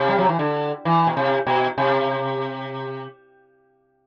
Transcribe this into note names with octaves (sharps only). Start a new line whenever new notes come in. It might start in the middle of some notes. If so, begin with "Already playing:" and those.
Already playing: C3
G3
F#3
E3
D3
E3
B2
C3
B2
C3